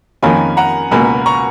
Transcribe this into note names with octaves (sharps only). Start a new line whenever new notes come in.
F2 D#3 A#3 C#4 F4 G#5 B5
F#5 A#5
C#2 B2 A#3 G#5 B5
A#5 C#6